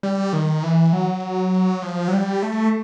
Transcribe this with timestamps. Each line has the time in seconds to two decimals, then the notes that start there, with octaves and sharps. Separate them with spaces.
0.03 G3
0.33 D#3
0.63 E3
0.93 F#3
1.82 F3
2.08 F#3
2.13 G3
2.42 A3